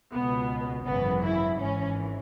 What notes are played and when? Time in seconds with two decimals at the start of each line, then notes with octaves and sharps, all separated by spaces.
0.12 C#2 B2 B3
0.86 G#1 F#2 C#3 E3 B3
1.23 E4
1.59 G#1 G#2 E3 C#4